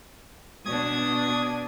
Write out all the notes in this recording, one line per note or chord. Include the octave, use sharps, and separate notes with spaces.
B2 D4 D#6 G#6